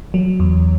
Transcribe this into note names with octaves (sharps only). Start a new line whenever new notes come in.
F#3
E2